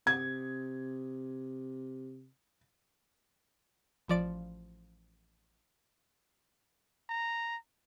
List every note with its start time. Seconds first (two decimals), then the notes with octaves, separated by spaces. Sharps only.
0.07 C3 G#6
4.08 A1 F3 D5 D7
7.10 A#5